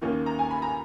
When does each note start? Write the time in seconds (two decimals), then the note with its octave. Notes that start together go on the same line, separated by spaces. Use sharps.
0.01 D#2 D#3 A#3 C#4
0.26 A#5
0.39 G#5
0.51 B5
0.62 A#5